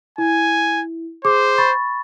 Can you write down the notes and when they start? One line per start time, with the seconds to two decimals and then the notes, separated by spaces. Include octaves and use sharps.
0.18 E4 G#5
1.25 G#4 C5 D6
1.58 B5 C#6 A6